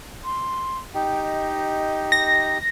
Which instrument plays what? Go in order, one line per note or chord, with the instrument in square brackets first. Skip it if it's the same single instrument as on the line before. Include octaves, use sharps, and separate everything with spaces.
[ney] C6
[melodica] D#4 G4 [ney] G5
[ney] D#5
[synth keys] A#6